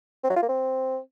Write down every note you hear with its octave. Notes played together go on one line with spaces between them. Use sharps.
C4
F#3
F4
A#3
C4